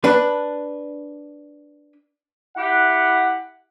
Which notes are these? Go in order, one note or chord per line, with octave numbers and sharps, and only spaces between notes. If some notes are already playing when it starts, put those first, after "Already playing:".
D4 B4
E4 G4 F#5